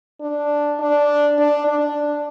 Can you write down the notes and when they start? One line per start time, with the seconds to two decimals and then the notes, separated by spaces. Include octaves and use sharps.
0.21 D4
0.79 D4
1.38 D4
1.67 D4